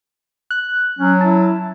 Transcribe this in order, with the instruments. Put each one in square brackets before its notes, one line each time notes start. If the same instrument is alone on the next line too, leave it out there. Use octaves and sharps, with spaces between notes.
[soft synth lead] F#6
[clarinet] F#3 [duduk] C#4
[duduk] E4 [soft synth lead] A5